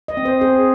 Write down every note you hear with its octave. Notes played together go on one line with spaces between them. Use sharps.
D#5
C4
C5
C4 G#4